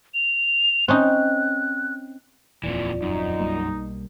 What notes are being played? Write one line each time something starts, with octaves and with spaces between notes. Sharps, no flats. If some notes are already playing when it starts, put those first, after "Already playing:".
F7
C4 C#4 D#4 F#6
D#1 F2 A#2 E3 F4 D5
F#2 D#4
B1 G3 A#3